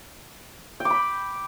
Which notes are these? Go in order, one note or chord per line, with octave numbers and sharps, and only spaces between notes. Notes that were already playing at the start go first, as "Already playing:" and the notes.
G5
D6
B5